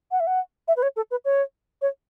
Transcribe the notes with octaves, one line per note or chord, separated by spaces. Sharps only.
F#5
E5
F#5
E5
B4
C#5
A4
B4
C#5
C#5